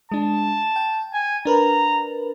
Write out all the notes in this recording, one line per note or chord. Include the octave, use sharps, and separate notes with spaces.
G#3 D4 A5
G5
G#5
D4 A#4 B4 A#5